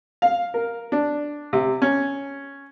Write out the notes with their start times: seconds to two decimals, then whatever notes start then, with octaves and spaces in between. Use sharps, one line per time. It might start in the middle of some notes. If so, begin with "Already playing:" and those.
0.22 F5
0.54 A#4
0.92 D4
1.53 C3
1.82 C#4